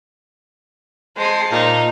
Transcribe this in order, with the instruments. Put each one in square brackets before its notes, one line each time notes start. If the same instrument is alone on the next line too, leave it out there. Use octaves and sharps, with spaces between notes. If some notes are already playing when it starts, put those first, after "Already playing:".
[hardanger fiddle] G#3 G#4 [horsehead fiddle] C5 A5
[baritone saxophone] A#2 [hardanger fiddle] D#4